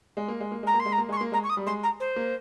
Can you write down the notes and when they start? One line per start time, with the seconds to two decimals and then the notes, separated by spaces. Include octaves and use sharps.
0.17 G#3
0.28 A#3
0.40 G#3
0.52 A#3
0.63 G#3 A#5
0.74 A#3
0.80 C6
0.86 G#3
0.92 A#5
0.98 A#3
1.09 G#3 C#6
1.17 C6
1.21 A#3
1.32 G#3 A#5
1.44 C#6
1.49 D#6
1.57 G3
1.66 G#3 C6
1.83 A#5
2.00 C5
2.16 A#3